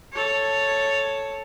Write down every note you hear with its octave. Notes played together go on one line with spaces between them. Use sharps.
A4 C#5